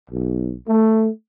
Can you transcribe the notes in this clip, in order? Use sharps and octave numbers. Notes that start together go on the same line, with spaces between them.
B1
A3